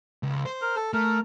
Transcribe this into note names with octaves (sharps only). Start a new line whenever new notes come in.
C#2
C5
A#4
A4
A3 A#4